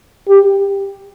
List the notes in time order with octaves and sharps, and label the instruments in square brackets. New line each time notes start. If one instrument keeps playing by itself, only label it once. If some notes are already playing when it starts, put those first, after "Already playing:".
[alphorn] G4